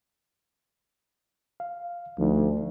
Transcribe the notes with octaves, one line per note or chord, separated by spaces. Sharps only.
F5
D2 F3 A3 D#4